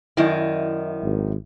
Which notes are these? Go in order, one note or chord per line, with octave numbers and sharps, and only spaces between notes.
F#2 D#3 E4 D5 D#5
G#1